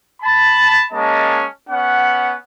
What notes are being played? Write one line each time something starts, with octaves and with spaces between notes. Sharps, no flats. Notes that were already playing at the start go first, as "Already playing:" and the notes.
A5 B5
G#3 A#3 C#4 D#5 A5
B3 C#4 F#5